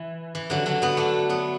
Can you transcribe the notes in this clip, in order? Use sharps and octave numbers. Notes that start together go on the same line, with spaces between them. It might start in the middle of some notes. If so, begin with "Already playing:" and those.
Already playing: E3
E3
D3 F#3
D3 F#3
F#3 B3
A3 D4
F#3 B3